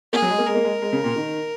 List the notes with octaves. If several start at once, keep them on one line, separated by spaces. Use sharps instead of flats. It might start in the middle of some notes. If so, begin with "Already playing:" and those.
A#3 G#4
F#3
G#3
A#3
G#3 A#4
A#3
G#3
G#3
C#3
A#2
D#3